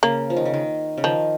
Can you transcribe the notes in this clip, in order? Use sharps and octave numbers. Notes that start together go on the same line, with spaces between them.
C#3 A#3
F3
D#3
C#3
D#3
C#3
D#3 F3